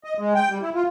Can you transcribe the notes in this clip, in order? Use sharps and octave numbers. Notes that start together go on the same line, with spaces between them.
D#5
G#3
G5
G3
E4
F4